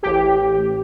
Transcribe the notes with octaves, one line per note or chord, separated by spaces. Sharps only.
A1 G4